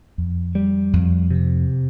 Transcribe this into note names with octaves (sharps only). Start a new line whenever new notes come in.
F2
G3
F2
C3